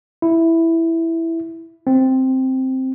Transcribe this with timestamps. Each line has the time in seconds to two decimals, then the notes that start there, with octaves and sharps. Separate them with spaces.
0.22 E4
1.87 C4